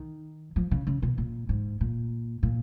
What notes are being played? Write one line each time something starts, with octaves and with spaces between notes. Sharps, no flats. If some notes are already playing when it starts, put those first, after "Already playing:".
Already playing: D#3
F3
C#3
C#3
B2
A#2
G#2
A#2
A#2